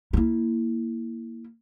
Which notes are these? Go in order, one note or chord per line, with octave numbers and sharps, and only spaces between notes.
A#3 E4